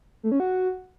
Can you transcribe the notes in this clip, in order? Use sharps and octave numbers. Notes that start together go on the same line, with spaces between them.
A3
C#4
F#4